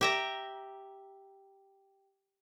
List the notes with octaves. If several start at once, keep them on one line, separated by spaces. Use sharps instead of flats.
G4 E5 A#5